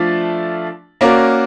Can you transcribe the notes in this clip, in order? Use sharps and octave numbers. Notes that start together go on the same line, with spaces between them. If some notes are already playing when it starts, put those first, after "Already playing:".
Already playing: F3 A3 D4 F4
A#3 C#4 F#4 A#4 D5